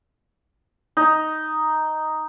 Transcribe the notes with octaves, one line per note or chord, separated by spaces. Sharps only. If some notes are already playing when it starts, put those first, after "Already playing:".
D#4